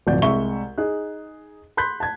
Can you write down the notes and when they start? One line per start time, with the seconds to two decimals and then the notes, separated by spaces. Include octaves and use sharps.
0.07 D1 B1 F2 F#4 D5 G6
0.22 C2 G#3 E5 C#6 G7
0.78 D#4 G#4 F#6
1.77 B5 C6 F#6 G6 B6
2.00 A5 G#6